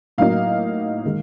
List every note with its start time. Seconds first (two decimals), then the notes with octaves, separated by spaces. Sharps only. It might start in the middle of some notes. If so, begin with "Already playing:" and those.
0.18 A2 F#3 A#3 D#4 F5
1.05 D#3 G#3